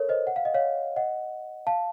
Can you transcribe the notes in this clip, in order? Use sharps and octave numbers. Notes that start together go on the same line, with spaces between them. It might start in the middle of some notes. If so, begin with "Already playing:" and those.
Already playing: A4 A#4 C#5
C5 D#5
F#5
F5
D#5
C#5 F5
D#5 F#5
F5 A5